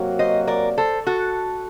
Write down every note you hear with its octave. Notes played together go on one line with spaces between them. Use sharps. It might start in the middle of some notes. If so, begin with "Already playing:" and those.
Already playing: C3 F#3 A#3 F#4
C5 D#5
A#4 D5
A4 C5
F#4 A4